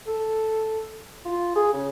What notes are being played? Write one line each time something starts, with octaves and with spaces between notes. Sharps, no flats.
A4
F4
G#4
C#3